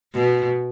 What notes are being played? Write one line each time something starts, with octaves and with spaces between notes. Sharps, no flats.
B2